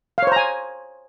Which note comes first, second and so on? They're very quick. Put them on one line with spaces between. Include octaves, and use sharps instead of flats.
F5 C#5 C5 A#5 G#5